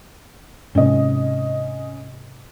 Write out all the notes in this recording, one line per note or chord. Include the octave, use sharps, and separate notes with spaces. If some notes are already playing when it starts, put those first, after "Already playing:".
G#2 C3 C#4 D#5